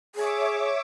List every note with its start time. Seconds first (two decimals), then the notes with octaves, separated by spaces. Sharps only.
0.15 G#4 C#5 E5 D6